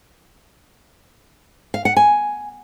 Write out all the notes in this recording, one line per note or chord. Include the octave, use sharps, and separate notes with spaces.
F5
F#5
G#5